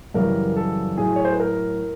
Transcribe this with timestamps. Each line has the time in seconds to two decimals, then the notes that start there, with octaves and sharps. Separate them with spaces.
0.14 F#2 C#3 E3 G3 A#4
0.57 A4
0.97 A2 F#3 G#4
1.16 C#5
1.25 C5
1.33 B4
1.40 A#4